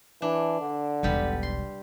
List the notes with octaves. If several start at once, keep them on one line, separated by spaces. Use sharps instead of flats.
E3 D4
D3
E1 B1 G3 B3
C6